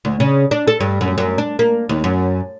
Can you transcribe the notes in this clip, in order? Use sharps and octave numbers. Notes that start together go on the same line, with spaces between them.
D2
C#3
D4
A4
G2
F#2
F#2
D4
A#3
D#2
F#2